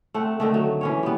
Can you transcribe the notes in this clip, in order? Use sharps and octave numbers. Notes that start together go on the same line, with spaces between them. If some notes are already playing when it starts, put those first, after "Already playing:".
A3 C4 F#5
D3 D#3 A3
F#3
E3 C#4 C#5
G3 B3